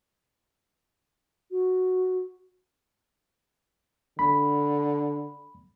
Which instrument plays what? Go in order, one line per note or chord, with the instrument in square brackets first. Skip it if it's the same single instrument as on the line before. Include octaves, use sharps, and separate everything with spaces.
[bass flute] F#4
[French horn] D3 [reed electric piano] B5